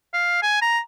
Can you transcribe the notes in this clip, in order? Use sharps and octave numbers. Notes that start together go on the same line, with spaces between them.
F5
G#5
A#5